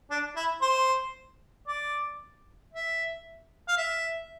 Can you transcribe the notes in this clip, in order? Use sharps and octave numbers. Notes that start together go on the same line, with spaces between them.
D4
E4
C5
D5
E5
F5
E5